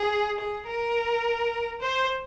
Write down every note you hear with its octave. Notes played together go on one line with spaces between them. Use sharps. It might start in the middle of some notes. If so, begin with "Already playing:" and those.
Already playing: G#4
G#4
A#4
C5